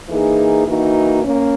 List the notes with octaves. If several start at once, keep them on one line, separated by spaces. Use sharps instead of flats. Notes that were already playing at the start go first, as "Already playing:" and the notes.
E3 A#3 D#4 G#4
E3 A#3 D#4 F#4
A#3 C#4